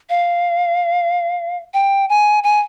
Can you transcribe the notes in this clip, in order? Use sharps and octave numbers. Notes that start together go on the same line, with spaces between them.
F5
G5
G#5
G#5